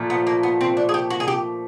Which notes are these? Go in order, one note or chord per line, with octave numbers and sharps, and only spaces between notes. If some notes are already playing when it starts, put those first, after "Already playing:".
Already playing: A#2 F3 A3
B3
A#3
B3
C4
D4
G#4
G4
F#4
G#4
G4